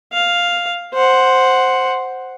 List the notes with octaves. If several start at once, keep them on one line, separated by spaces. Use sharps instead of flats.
F5
C5 F#5